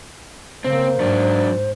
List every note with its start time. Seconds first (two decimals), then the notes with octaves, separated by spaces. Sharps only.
0.64 C#3 A#3 C4 C5
1.00 G#2 F#3 D4